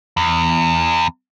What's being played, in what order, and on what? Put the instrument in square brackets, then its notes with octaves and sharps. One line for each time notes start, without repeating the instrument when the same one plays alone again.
[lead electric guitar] E2